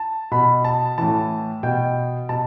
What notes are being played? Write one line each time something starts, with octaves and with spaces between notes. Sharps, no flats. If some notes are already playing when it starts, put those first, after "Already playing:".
Already playing: A5
B2 B5
A5
A2 E3 A5
B2 G5
B2 A5